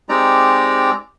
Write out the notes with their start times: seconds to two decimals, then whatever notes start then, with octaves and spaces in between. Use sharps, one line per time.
0.09 G#3 C4 D#4 G4 D5 A#5